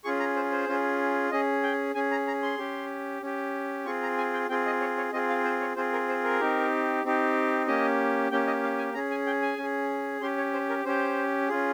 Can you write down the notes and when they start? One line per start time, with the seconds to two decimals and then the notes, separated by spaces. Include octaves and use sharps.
0.04 C#4 F4 G#4 C#6
0.20 A#5
0.36 C5
0.52 C5
0.68 C#4 F4 G#4
1.31 C#4 G#4 D#5
1.63 G5
1.95 C#4 G#4 G#5
2.11 A#5
2.27 A#5
2.43 C6
2.58 C#4 G4
3.22 C#4 G4
3.86 C4 F4 G#4 C#6
4.02 A#5
4.18 G#5
4.34 G5
4.49 C4 F4 G#4 G5
4.66 D#5
4.81 C#5
4.97 C#5
5.13 C4 F4 G#4 D#5
5.29 F5
5.44 C5
5.61 C#5
5.76 C4 F4 G#4 C5
5.93 A#4
6.09 C5
6.24 A#4
6.40 C4 D#4 G4
7.04 C4 D#4 G4
7.67 A#3 C#4 G4 D#5
8.31 A#3 C#4 G4 G5
8.47 D#5
8.63 F5
8.78 G#5
8.94 C#4 G#4 A#5
9.10 G#5
9.26 G5
9.42 G#5
9.58 C#4 G#4
10.21 C#4 G4 C6
10.38 C#5
10.53 C5
10.69 A#4
10.85 C#4 G4 C5
11.49 C#4 F4 G#4